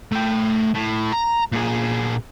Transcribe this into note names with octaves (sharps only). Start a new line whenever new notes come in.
A3 G5
A2
A#5
A#2 G#4